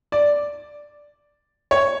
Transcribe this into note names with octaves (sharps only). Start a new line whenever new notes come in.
D5
C#5